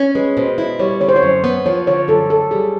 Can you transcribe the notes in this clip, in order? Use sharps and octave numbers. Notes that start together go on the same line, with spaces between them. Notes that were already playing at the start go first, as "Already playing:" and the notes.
Already playing: C#4
G#3 B4
B2 C5
E4
G3 C#5
D3 C#5
C5
C#5
F#2
B3
F3 C#5
D3 C#5
F#2 A4
F#2 A4
G3 G#4